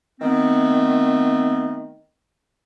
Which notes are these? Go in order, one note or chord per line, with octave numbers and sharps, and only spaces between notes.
D#3 A3 B3 C4